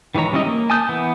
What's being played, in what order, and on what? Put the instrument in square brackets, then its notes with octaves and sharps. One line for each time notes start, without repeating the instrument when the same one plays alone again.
[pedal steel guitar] D#3 E3 G#3 C#5 A#5
G3 C#4 E4 D5 D#5
A#3
G#5 A5 D#6 G6
E3 B3